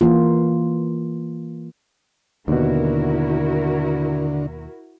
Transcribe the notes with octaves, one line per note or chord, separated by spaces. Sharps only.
E3 A#3 F4
D#2 B2 D3 E4 F#4 A#4